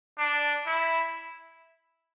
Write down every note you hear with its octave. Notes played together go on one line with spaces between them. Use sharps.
D4
E4